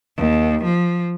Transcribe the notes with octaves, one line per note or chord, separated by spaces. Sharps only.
D#2
F3